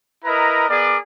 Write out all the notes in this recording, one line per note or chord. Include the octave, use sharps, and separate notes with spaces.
E4 A#4 B4 D#5 A#5
B3 G#4 A#4 D5